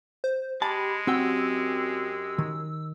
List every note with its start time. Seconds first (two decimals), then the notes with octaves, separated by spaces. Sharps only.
0.24 C5
0.62 G#3 G4 A5 B5
1.07 F#2 C4 F#4 G4 G5 E6
2.38 D#3